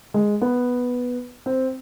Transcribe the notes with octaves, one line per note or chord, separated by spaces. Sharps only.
G#3
B3
C4